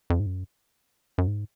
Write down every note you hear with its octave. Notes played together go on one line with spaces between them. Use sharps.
F2
G#2
F#2
F#2
G#2